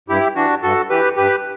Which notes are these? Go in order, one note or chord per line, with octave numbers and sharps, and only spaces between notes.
G2 E4 G4
E3 D4 F#4
G2 F#4 A4
E3 G4 B4
G2 G4 B4